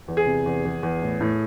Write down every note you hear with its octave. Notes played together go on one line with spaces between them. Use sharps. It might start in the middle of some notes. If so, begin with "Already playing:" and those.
E2
G#4
C3
E2
E2
E2
A2
A2